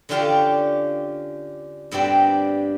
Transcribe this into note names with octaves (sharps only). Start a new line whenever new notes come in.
D3 C#4 D4 F4 G4 F5
G2 B3 C4 D4 G4